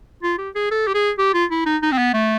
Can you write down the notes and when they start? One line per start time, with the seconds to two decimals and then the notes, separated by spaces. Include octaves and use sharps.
0.23 F4
0.38 G4
0.55 G#4
0.71 A4
0.87 G4
0.94 G#4
1.18 G4
1.34 F4
1.51 E4
1.66 D#4
1.82 D#4
1.92 C4
1.98 B3
2.14 A3